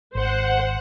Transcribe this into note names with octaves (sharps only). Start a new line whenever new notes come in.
G#1 C5 F#5